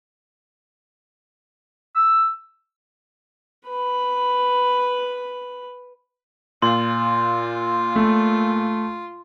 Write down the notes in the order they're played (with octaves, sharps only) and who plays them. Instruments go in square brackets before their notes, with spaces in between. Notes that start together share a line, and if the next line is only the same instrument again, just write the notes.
[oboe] E6
[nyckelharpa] B4 B5
[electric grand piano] A#2 [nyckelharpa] F4 [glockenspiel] C6
[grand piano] A3